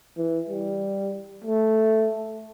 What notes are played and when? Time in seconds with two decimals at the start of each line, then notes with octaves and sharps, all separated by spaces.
0.18 E3
0.49 G3
1.44 A3